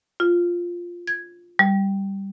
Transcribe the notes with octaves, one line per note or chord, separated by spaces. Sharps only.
F4
G#6
G3